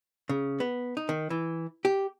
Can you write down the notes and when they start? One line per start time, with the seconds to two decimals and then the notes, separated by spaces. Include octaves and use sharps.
0.29 C#3
0.60 B3
0.97 D#4
1.09 D#3
1.30 E3
1.85 G4